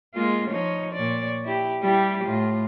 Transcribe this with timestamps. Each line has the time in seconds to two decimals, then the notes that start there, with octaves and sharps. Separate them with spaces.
0.14 G#3 A#3 F4
0.50 F3 D#4 C#5
0.93 A#2 C#5 D5
1.45 E4 G4
1.82 G3 E4 G4
2.24 A2 F4